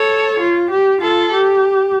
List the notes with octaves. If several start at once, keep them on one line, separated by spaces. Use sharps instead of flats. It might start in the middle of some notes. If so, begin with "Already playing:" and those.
Already playing: A4 C#5
F4
G4
F4 A4
G4